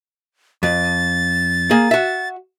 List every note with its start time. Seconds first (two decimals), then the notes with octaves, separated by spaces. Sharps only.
0.63 F2 A6
1.71 A#3 G#4
1.91 F#4 E5